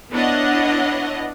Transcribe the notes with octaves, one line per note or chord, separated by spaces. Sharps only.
B3 D4 E4 C#5 D#5 F#5